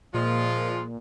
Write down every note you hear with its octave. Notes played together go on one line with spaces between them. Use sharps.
A#2 F3 G#3 F4